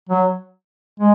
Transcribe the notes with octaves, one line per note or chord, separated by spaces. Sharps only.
F#3
G#3